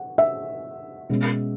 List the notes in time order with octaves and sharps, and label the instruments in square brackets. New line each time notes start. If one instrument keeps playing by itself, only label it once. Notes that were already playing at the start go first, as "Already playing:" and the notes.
Already playing: [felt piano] F#5
E5
B2 G#3 C#4